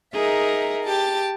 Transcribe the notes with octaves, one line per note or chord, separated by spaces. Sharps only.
D#4 G#4 A#4 E5
G4 A5